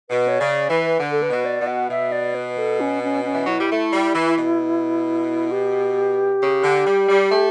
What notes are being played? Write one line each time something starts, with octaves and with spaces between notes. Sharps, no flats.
B2 B4
C#5
C#3 D5
E3 B4
D3
A4
B4
B2
D5
B2
F#5
B2 E5
D5
B4
A4
C#4
C#4
C#4
E3
F#3 E4
G3
A3
G3
E3
B2
G4
C#3
D3
G3
G3
A3